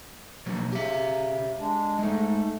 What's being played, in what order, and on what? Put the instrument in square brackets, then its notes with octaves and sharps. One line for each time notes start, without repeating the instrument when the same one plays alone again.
[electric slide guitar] B2 F#3 A#3
[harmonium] C#3 [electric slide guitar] G4 E5
[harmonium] G#3 D4
[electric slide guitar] G#3 D#4 [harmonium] A3